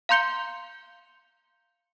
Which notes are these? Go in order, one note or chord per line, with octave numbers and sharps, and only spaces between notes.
F5 A#5 C6 G6 C#7 G7